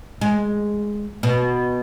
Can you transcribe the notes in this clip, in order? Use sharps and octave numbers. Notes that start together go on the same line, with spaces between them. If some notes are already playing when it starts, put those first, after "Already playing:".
G#3
B2